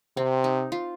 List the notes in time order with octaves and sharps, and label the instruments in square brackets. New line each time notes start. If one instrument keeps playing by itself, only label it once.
[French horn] C3 [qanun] C4
[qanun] D#4
F4